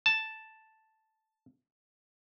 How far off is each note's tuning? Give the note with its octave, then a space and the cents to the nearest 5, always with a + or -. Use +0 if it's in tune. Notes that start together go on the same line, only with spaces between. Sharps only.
A5 +0